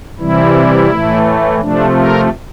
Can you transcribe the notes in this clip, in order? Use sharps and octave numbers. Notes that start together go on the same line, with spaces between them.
C3 E3 G3 E4
A2 E3 A3
C3 F3 A3 D4
A#4